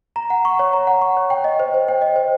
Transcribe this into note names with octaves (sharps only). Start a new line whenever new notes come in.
A#5
F#5
C#6
C#5
A#5
F#5
C#6
C#5
G5
D#5
C5
C5
G5
D#5
C5